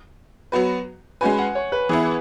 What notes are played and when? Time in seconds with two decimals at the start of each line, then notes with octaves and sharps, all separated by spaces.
0.52 F#3 B3 F#4 B4
1.21 G#3 C#4 F#4 B4 G#5
1.38 F#5
1.55 C#5
1.72 B4
1.89 E3 B3 E4 G#4